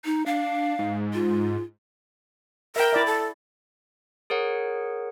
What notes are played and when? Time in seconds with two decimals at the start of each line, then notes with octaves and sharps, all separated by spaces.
0.05 D#4
0.26 D4 F5
0.79 G#2
1.14 F4
2.76 A#4 E5 G5
2.93 E4 D5 E5
3.06 A4
4.30 G#4 A#4 C#5 F#5